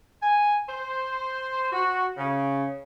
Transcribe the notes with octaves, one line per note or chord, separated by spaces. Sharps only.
G#5
C5
F#4
C#3